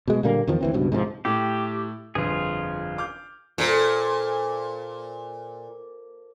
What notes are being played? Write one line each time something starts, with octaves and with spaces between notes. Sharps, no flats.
B2 G#3
A#2 D3 G3 A#3
E2 D#3 F3
D2 E3 C4
C#2 G2 B2
G#2 C3 D#3 F3
A2 G4
G1 F2 F4 G#4
D6 F6 G6
A#2 F4 A4 C5